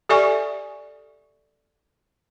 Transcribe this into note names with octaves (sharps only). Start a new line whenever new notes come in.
G4 A4 D5 E5 G#5 C#6